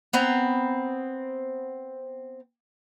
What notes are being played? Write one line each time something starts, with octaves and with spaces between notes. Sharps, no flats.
B3 C4 A#5